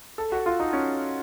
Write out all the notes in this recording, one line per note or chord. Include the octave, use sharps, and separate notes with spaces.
A4
F#4
F4
D#4
C#4